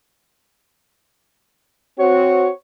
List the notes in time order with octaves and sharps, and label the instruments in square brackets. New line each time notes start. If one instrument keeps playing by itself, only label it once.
[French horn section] C4 F#4 [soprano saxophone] C#5